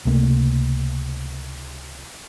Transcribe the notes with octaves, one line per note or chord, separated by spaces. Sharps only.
C#2 C3 A3 A#3